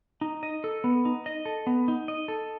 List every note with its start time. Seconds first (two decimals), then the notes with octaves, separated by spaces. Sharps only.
0.21 D#4
0.43 D#5
0.64 A4
0.84 B3
1.05 D#4
1.26 D#5
1.46 A4
1.67 B3
1.88 D#4
2.08 D#5
2.28 A4